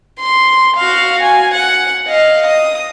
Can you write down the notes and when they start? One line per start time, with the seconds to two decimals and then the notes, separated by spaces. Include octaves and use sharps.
0.19 C6
0.76 F#4 F5
1.23 G#5
1.54 F#5
2.07 D#5 F5
2.47 D#6